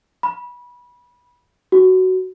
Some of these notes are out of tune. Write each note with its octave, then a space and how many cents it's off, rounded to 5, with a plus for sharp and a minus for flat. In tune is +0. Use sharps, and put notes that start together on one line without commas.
B5 -20
F#4 +10